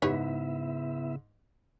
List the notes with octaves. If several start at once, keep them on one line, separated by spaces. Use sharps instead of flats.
G#2 C#3 B3 E4 G4 B4 C#5 E5